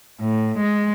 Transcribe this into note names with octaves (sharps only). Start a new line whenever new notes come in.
A2
G#3